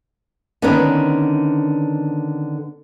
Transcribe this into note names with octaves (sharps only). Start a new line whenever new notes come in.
D3 D#3 B3 C#4 D4 B4